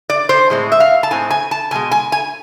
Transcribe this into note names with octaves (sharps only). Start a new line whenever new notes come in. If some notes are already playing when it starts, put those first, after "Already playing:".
D5
C5
A2 G#3 C4
E5
F5
A5
A2 G#3 C4 G#5
G#5
A5
E2 B2 G#3 G#5
G#5
G#5